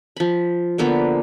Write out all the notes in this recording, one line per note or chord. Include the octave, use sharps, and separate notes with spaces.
F3 B5
D3 F3 A#3 B3